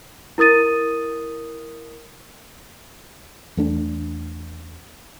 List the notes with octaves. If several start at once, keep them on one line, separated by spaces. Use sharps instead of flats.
E4 A#4 D#6 A6 D#7
E2 A3 D4